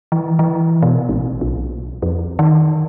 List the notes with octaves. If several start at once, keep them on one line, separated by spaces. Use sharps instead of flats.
E3
E3
B2
A1
B1
F2
D#3